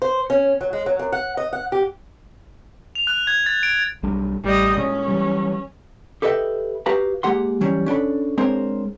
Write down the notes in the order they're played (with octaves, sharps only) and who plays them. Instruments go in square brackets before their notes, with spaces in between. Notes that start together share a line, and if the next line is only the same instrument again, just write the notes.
[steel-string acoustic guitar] C5
C#4
F#3
G#3
F#3
F#2
F#5
D#5
F#5
G4
[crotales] F7
F#6
G#6
A6
D7
[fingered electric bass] B1 G3 D4
[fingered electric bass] A1 [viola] G3 D#5
[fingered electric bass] A#2 G#3 [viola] C#4
[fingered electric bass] E3 F#3 G3
[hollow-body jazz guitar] G4 A4 B4 D#5 E5 G5
F#4 G4 B4 F5 A#5
G#3 A#3 G4 F#5 C6
E3 F#3 G3 C#4
C#4 D4 A4 B5
G#3 C4 D4 A#4 C5 C#5